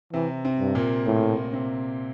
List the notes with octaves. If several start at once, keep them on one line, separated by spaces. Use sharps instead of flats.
C3 E3 C4
C3 C4
G2
A#2 A#3
A2
C3 C4